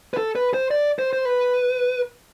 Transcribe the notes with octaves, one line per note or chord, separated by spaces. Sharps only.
B4
A4
B4
C5
D5
C5
C5
B4